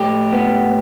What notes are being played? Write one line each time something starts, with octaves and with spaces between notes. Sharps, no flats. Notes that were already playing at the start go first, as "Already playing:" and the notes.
Already playing: A2 G4
B3